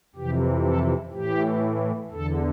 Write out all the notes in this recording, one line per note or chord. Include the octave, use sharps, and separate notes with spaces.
F2 C3 E3 G4
A4
A2 E3 G4
E2 D3 A4